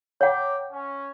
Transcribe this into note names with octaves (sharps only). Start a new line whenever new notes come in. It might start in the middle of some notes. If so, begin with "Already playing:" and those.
C#5 F#5 G5 A#5 D6
C#4